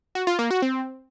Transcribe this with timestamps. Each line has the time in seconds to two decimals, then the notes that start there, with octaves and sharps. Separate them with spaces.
0.15 F#4
0.27 F4
0.39 A#3
0.51 F#4
0.62 C4